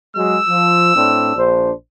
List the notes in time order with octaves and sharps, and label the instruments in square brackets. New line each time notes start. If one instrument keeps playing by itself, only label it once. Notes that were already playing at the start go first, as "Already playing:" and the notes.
[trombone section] F#3 G#3 [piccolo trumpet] E6
[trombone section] F3
A2 C4 D4
A#1 D4 C5